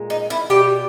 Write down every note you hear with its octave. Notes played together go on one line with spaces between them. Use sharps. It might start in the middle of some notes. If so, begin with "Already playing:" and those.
Already playing: A#2 G#3
D#4
E4
B2 G3 G4